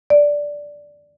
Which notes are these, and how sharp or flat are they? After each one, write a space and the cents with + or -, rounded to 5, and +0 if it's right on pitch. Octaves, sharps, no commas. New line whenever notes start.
D5 -5